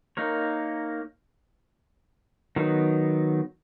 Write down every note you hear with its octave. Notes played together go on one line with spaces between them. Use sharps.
A#3 D#4 A#4 C#5
D#3 F#3 B3 D#4